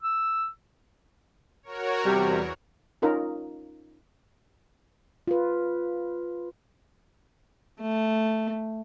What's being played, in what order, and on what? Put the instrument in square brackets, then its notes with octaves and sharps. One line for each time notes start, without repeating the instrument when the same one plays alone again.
[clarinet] E6
[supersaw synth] F#4 A#4 C#5
[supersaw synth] E2 [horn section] C3 G3
[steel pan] C#4 D#4 F4 A#4
[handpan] F4 B4
[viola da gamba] A3